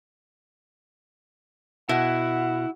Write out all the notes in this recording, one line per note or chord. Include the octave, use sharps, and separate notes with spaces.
B2 E4 F#5